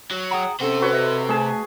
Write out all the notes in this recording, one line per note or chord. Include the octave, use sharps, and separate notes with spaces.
F#3
G#4 F#5 G5 A#5
C3 C#4 A4 C5 F#5
F#4 B4 C#5
D#5 E5
A3 G#4 G#5 A5